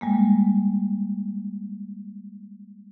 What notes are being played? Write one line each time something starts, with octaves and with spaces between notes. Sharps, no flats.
G3 G#3 A#3